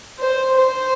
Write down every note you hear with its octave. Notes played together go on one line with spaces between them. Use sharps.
C5
C5